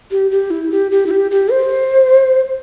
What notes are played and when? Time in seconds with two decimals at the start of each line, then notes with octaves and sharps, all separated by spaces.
0.11 G4
0.31 G4
0.51 E4
0.71 G4
0.91 G4
1.06 E4
1.11 G4
1.31 G4
1.51 C5